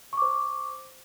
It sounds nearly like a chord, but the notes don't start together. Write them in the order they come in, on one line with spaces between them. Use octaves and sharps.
C#6 D6 C5